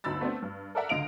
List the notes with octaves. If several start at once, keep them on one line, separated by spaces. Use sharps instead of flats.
G1 D2 D#4 B5 E6 A6
A3 B3 C4 D4
G2
A4 A#4 D5 E5 F#5 A#5
C#2 D3 D#5 F5 D7 F7